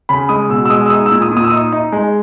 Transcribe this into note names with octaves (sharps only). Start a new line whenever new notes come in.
C#3 B5
G#3 D#6
B2 E6
E6
G#3 D#6
E6
D#4 D#6
E6
A#2
D#6
A#2
D#6
E6
D#4 D#6
D#4
G#3